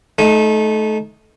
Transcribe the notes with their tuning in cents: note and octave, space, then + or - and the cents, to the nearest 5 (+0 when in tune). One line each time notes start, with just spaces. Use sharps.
A3 -25 D#4 +0